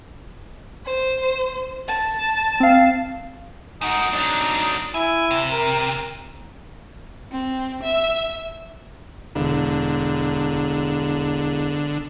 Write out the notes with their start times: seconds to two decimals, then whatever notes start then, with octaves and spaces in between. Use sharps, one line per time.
0.86 C5
1.88 A5
2.60 C4 F5
3.81 G#2 D#4 F#4
4.13 F#3 D4 D#4
4.94 E4 G#5
5.31 C3
5.52 A#4
7.32 C4
7.83 E5
9.35 E1 D3